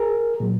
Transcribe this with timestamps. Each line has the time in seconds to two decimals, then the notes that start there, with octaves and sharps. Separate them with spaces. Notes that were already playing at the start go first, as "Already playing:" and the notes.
Already playing: G#4 A#4
0.40 A#2 F#3